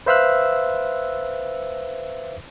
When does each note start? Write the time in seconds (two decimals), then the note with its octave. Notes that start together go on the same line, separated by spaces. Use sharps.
0.06 B4 C5 E5 F5 E6 F#6